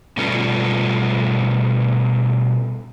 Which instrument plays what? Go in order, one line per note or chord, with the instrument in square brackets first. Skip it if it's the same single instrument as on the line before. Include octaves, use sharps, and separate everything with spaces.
[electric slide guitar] B2 G3 A3 B3 C#4 F4